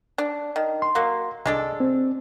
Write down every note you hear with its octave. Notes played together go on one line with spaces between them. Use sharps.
D4
D#3
C6
F#3 A#3
C2 G#3 D4 A4
C4